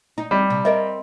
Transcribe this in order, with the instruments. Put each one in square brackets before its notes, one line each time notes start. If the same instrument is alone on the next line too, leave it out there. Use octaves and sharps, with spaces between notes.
[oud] D#4
[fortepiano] G3
[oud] C3
[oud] C4 A#4 [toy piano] D#5 E5